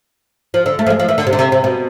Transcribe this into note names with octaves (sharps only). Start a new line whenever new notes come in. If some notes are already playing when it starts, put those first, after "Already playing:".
F3
D3
A3
F3
G#3
F3
E3
D3
C3
D3
C3
C3
B2